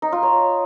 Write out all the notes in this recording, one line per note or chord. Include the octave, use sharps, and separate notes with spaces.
D#4
F4
C#5